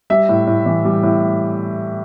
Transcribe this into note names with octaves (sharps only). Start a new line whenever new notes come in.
G3 E5
A2
A2
E3
G3
A2